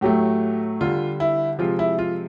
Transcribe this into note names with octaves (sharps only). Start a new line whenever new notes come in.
A2 F#3 A3 G4
D3 G3 F4
E4
C3 F3 G#3 F4
E4
F4